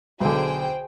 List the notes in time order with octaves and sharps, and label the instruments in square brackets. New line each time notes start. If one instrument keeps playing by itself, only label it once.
[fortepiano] B1 D3 [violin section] G#4 C5 G5